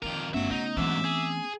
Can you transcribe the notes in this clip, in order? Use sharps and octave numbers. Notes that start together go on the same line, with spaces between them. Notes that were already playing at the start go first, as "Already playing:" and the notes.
F2 D#3 D#4 F4 G4 A#4
G1 D#2 F#3 A3 B3 C#4 F#4 E5
C#3 D#4
G#2 E3 F#3 C4 E5 D6
G#4